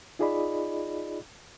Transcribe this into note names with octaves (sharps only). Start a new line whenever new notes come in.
D#4 F4 G#4 D5 D#5 B5